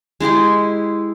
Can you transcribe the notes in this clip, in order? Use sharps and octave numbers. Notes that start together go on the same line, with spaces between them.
G#3 E4 G4 G#4